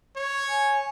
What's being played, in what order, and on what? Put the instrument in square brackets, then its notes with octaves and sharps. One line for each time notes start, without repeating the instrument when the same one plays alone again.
[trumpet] C#5
[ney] G#5